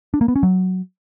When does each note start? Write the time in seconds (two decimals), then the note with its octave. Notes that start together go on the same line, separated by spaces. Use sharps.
0.14 D4
0.21 A#3
0.28 B3
0.36 C#4
0.43 F#3